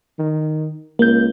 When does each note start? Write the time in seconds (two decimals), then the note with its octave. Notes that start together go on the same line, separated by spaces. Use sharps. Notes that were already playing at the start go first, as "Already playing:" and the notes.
0.19 D#3
0.99 C#2 A#3 G6